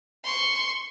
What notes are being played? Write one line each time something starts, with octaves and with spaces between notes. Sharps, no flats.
C6 C#6